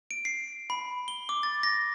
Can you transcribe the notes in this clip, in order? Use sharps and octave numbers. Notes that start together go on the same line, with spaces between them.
D7
C7
B5
G7
D6
A6
A#6